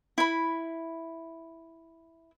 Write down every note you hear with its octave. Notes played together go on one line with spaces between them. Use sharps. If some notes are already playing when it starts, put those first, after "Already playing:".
E4 B5